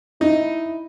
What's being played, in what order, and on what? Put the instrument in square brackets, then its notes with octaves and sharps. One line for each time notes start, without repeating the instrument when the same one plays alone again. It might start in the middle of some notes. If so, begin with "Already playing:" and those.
[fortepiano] D#4 [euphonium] E4